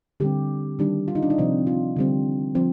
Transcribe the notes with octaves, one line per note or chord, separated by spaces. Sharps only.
D3 G3 C4 G4
D#3 G3 D4
F4
D#4
D4
D#4
C3 F3 C4
F4
D3 G3 C4
F3 C4